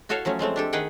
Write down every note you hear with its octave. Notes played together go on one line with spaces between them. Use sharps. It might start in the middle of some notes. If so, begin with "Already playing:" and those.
E4 F#4 A4 C#5 E5 F5
F3 F#3 A3 C#4
F3 G#3 A3 C4
D4 G4 A4
D#3 G#4 B4 F#5 G5